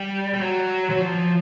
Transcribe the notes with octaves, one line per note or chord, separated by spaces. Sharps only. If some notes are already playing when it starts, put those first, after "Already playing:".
Already playing: G3
G3
F#3
F#3
F3